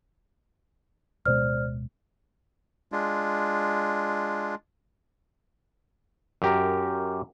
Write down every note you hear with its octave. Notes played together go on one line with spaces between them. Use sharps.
D1 B2 G#3 C5 D5 F6
G#3 D4 F4
F#2 G4 A#4